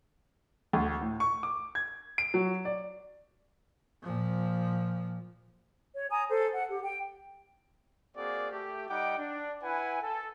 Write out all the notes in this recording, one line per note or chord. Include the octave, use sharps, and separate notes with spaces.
D2
A2
C#6
D6
G#6
D7
F#3
D5
A#2 F3
C#5
G#5 A#5 D#6
A4 C5
F#5
G4
G5
A#3 C4 F#4 G#4 D5
A3 G4
G3 D#4 F#5 G5 D6
D4
E4 B4 F#5 G#5
A4